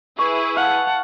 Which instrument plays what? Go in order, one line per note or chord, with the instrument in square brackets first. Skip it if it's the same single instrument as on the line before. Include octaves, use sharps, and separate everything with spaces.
[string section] E4 G#4 B4 [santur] C#6
[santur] F5 [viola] F#5 A5